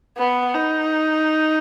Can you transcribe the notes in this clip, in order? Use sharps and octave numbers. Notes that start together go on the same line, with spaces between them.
B3
D#4